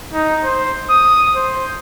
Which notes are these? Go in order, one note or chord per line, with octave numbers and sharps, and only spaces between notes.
D#4
C5
D#6
C5